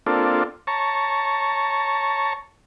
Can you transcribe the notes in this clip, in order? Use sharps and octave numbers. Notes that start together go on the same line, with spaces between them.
A#3 C4 D4 F4 A4
C#5 A5 A#5 C#6